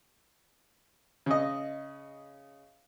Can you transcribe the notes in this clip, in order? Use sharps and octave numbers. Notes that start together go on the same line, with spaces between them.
C#3 D#5